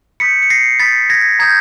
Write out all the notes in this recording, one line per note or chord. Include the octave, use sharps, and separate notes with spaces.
B5 D#6 G6 B6 C#7
C#7
A#6 C7
B5 D#6 G6 A6 B6
G#6 A#6
A#5 D#6 G6 G#6